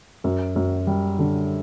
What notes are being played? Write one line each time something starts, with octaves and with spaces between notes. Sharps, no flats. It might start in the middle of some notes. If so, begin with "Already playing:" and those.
F#2
F#2
G3
D3